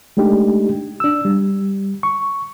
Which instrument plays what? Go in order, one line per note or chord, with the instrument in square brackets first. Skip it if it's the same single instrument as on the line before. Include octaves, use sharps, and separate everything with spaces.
[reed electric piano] G#3 A3 D4 D#4 G4
D4 E6
G3
C#6